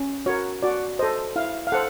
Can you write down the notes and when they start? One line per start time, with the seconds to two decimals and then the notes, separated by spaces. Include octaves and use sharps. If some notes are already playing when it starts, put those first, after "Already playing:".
Already playing: C#4
0.26 F#4 A#4 C#5
0.63 F#4 D5
0.99 A4 C5 D#5
1.36 E4 F5
1.67 F5
1.72 A4 C5 F#5